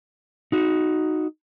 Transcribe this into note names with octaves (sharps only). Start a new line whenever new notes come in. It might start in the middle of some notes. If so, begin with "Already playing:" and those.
D#4 F#4